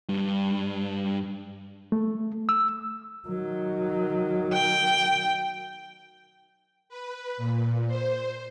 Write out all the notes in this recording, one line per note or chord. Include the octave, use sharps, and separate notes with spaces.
G2
A3
E6
D#3 F#3
G5
B4
A#2
C5